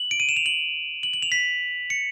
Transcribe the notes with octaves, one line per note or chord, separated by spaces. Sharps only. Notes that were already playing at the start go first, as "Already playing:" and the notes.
Already playing: F#7
D7
D#7
E7
F7
F#7
F#7
F#7
F7
B6
C#7